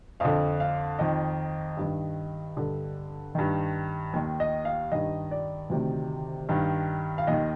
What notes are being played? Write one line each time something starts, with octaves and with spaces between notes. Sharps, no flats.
F2 D3 F5
F5
F2 D#3 D#5
G2 D#3
G2 D3
G2 D#3
D#2 D#3
D#5
F5
G2 D#3 D#5
D5
D2 C3 D#3
G2 D#3
F5
D#2 D#3 D#5